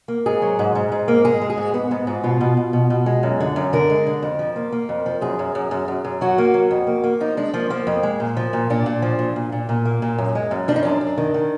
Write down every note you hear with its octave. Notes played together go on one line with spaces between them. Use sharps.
A#3
G#2 G#4
F#3
G#2
G#2
G#2
A#3
G#3 G#4
G#3
G#4
G#2
G#2 B3
G#2 B3
G#2 F4
B2 F4
B2
B2
B2
B2
G#3
F#2
D3
F#2
D3 A#4
G#3
D3
F2
F3
A#3
A#3
F2
F3
F#2 G#4
F#2
F#2
F#2
F#2
F#2
F#3 F#4
A#3
F#3
F2
A#3
A#3
F3 D#4
G#3 D4
F3 A#3
F3 A#3
F2
G#3
A#2
F3
A#2
A#2 D4
A#2
F3
A#2
A#2
A#2
A#2
A#3
A#2
F#2
G#3
F#2
F3 D4
D#4
F#2 D4
F#2
D#3
D#3